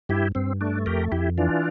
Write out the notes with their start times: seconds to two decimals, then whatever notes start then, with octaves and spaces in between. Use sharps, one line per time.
0.09 G2 E4 G4
0.35 G2 C4
0.61 A3 D4
0.86 F2 G4 A#4
1.12 F2 E4 G4
1.38 E3 D4 F4